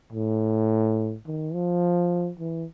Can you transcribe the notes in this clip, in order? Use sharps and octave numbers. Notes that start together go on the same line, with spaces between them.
A2
D#3
F3
E3